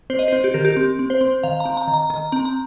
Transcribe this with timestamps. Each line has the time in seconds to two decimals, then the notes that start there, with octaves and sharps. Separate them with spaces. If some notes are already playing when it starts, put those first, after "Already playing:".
0.10 C4 C5
0.19 D#5
0.28 C4 C5
0.44 G4
0.54 D#3 A#4
0.65 G4
0.77 C4
0.99 C4
1.10 C5
1.21 C4
1.43 D#3 F5
1.60 A#5
1.65 C4
1.77 A#5
1.88 D#3
1.94 A#5
2.10 D#3 A#5
2.32 C4 A#5
2.45 A#5